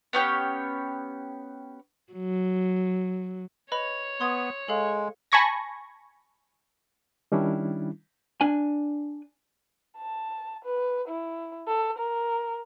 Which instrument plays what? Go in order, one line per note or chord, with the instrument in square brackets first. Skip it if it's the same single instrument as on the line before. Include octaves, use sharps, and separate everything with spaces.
[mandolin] B3 C#4 G4 C#5
[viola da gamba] F#3
[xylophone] B4 D#5 B5 [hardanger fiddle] C#5
[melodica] B3 [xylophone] C6 D#6 G#6
[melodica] G#3 [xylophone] G#4 A4 F5
[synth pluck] G#5 A5 B5 C#6 G#6 A#6
[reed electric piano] D#3 G3 C#4 D4 E4
[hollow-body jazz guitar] D4 G#5
[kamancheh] A5
B4
E4
A4
A#4